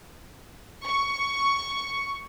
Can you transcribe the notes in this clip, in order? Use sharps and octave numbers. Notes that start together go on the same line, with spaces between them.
C#6